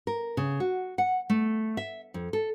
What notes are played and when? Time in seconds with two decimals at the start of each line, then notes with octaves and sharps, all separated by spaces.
0.07 A#4
0.37 C#3
0.60 F#4
0.98 F#5
1.30 A3
1.77 E5
2.14 F2
2.33 A4